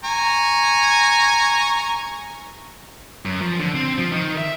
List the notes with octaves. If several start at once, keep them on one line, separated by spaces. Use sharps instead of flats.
G#5 A#5 C#6
F#2
F3
D3
C4
F3
D#3
E5